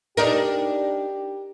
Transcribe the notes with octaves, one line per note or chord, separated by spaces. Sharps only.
D4 D#4 G4 A#4